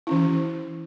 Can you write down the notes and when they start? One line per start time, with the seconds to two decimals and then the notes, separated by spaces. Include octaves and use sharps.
0.07 E3 C#4 E4